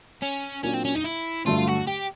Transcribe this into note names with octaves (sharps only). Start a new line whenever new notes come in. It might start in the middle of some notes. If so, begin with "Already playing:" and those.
C#4
A#2 F#3 A#3 C#4 D4
C4
C#4
D#4
E4
G2 D3 F#3 A3 F4
F#4
G4